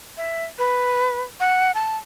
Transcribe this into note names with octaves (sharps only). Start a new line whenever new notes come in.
E5
B4
F#5
A5